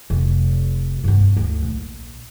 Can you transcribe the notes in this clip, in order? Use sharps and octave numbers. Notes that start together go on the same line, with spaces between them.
F1
G2 B3
D2
A#1